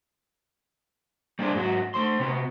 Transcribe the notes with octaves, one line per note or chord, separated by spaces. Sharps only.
G3 A#3 D4 G#4 C5
G#2 F#3 F#4
A3 C5 C6
C3 B3